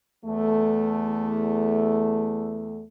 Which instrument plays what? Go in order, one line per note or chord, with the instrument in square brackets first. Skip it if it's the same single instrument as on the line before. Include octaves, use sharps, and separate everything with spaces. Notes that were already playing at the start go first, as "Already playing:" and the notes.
[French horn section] E2 A3